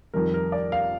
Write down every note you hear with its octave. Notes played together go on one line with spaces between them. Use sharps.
F2 D#3 G3 A#4
A#4
D5
F5